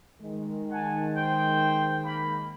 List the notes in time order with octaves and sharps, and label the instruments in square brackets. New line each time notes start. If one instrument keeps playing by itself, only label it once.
[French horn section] D#3 G#3
[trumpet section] F#5 G#5 A5
C5 G5
A#3 B5